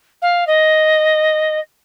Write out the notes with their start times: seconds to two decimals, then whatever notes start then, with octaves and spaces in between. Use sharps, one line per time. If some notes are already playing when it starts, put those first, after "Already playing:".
0.22 F5
0.47 D#5